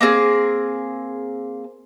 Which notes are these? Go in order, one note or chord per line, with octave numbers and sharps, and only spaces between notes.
A#3 C4 G#4